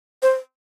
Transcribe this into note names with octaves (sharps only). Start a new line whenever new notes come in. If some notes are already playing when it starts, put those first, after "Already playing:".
C5